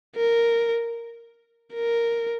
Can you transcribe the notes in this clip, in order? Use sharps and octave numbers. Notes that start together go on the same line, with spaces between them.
A#4
A#4